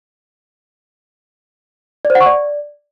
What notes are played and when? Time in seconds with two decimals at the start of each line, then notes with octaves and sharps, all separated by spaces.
2.05 D5
2.10 C5
2.15 F#5
2.21 C#6
2.26 D5